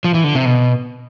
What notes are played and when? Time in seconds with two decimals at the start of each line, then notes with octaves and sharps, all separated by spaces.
0.04 F3
0.14 E3
0.24 D3
0.35 C3
0.45 B2